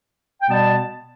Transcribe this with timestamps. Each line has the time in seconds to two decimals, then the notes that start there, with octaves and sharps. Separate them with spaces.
0.42 G5
0.50 B2 G3 B3 A5